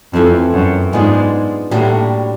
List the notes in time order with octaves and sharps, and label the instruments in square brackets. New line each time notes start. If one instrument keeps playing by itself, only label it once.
[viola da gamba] F2 [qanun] E3 A3 C4
[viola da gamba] F#2
[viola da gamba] G#2 [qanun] G#3 B3 D4 F4
[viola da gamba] A2 [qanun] G3 A#3 D4 F#4